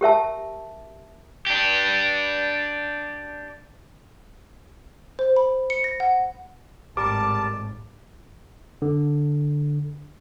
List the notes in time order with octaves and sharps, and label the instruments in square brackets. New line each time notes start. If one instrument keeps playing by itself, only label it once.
[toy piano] G4 A#4 E5 A5
[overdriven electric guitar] D4 G4
[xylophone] C5
B5
C#7
A#6
F#5
[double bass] G#1 A2 [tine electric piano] G3 A#4 [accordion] A5 [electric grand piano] D6
[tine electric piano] D3